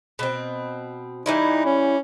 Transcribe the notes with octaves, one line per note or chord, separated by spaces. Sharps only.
B2 C4
E3 G3 D#4 E4
C#4